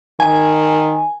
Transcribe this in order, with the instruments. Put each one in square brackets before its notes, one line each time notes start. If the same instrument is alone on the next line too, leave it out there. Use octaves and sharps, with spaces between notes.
[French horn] D#3 [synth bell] G#5